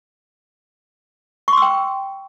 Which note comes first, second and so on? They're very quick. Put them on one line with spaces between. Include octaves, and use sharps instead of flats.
C#6 C6 E6 G5